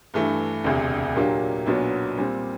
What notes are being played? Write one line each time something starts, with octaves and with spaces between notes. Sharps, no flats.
G2 E3 A3
E1 D2 C3
A#2 F#3 A#3 D4 G4
B1 A#2 F#3 B3 D4
A#2 G3 C4